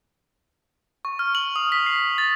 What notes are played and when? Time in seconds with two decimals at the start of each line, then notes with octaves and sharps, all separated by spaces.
1.05 C#6
1.19 F6
1.35 F#7
1.56 D#6
1.72 B6
1.86 C7
2.18 A6